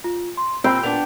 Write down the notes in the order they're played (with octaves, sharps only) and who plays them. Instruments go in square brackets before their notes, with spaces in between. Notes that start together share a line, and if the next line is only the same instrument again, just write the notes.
[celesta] F4
C6
[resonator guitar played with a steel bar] A#2 [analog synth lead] C4 [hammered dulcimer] G5 [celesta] B5 E6
[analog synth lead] A#2 [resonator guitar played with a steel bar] B3 D4 [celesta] F7